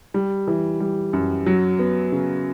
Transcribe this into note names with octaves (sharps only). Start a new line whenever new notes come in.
G3
E3
G3
F#2
F#3
B3
C#3